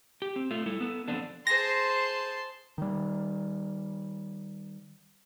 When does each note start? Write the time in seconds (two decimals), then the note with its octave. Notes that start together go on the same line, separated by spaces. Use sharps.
0.22 G4
0.36 C4
0.51 A3 F4
0.66 G3 E4 A4
0.80 B3 A4
1.08 F3 G3 B3 C4 D4 A4
1.47 G#4 C5 A5 C6 A#6
2.78 D#3 G3